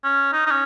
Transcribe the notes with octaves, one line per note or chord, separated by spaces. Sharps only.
C#4
D#4
D#4
C#4